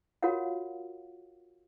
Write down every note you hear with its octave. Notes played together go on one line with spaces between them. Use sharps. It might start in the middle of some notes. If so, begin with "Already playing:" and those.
F4 F#4 A#4 C#5 F5 F#5